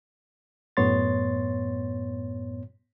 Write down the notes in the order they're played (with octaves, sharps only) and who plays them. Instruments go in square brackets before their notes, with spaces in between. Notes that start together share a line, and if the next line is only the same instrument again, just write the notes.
[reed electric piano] F#2 A2 B3 C#5 C6 A6